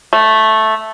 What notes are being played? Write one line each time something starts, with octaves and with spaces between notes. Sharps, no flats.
A3